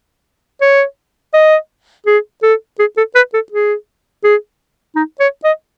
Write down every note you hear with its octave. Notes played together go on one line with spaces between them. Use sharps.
C#5
D#5
G#4
A4
G#4
A4
B4
A4
G#4
G#4
D#4
C#5
D#5